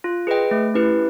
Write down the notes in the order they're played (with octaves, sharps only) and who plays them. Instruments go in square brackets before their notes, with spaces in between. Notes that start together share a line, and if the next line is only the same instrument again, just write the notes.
[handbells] F4
G#4 B4 D#5 G5
A3
C#4 E4 G4 B4